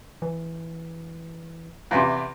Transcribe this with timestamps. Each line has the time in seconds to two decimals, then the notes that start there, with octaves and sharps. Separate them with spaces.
0.22 E3
1.91 E2 C3